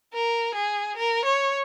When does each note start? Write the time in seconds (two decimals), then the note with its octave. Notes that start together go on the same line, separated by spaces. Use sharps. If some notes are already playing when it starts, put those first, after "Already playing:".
0.13 A#4
0.55 G#4
0.97 A#4
1.25 C#5